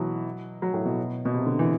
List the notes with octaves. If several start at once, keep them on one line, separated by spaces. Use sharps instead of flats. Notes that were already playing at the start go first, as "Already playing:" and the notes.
Already playing: B2 E3 F#3
F#3
A2
B2
B2
C3
D3
E3